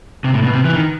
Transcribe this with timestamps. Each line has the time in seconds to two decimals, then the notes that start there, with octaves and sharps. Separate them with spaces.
0.24 C3
0.34 A2
0.44 B2
0.53 C3
0.65 E3
0.74 D#3